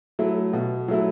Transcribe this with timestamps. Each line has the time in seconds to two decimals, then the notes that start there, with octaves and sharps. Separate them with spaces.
0.19 F#3 A3 E4
0.53 B2
0.88 F#3 A3 E4